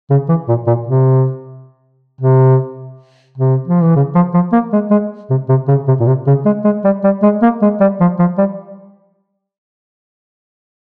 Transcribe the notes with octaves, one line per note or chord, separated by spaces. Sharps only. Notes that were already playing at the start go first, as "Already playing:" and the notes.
C#3
E3
A#2
A#2
C3
C3
C3
F3
E3
C#3
F3
F3
A#3
G#3
G#3
C3
C3
C#3
C3
A#2
C3
C#3
G#3
G#3
G3
G3
G#3
A#3
G#3
G3
F3
F3
G3